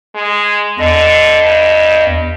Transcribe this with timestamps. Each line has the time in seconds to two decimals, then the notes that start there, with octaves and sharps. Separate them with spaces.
0.15 G#3
0.79 E2 D3 D#5
1.43 G2